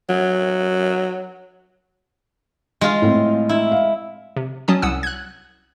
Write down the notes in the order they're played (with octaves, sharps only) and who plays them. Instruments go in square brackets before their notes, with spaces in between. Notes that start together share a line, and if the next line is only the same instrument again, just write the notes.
[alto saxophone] F#3
[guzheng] G#3 F4
[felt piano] A2 C4
[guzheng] E4
[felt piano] F5
[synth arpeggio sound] C3
F#3 C#4 A5 D#6
C2 F#5 D#6 E6
F#6 G#6